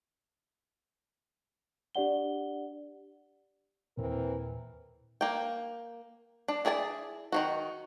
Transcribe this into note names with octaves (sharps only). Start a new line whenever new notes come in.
D4 G4 D5 F#5 G7
D#2 A#2 E3 C4 A#4
A#3 G5
D4
E4 G#4 D5 G#5 A5
D#3 F3 F#4